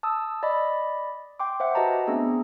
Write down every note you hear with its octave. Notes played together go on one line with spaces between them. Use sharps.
A5 D#6 E6
D5 D#5 B5
G5 C6 D6
C5 E5 F#5
F#4 G4 B4 D#5 A5 A#5
A3 B3 C4 D4 G#4 A#5